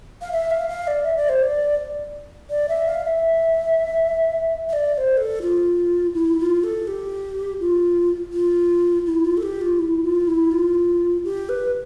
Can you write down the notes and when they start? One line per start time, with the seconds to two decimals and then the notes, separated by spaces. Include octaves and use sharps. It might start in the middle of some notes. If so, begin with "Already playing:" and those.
0.21 F5
0.32 E5
0.51 F5
0.69 F5
0.87 D5
1.05 E5
1.17 D5
1.29 C5
1.42 D5
2.50 D5
2.69 E5
2.87 F5
3.05 E5
4.69 E5
4.73 D5
4.94 D5
4.98 C5
5.17 A4
5.42 F4
6.14 E4
6.40 F4
6.64 A4
6.88 G4
7.60 F4
8.33 F4
9.06 E4
9.25 F4
9.37 A4
9.43 G4
9.61 F4
9.79 E4
10.04 F4
10.27 E4
10.52 F4
11.24 G4
11.49 B4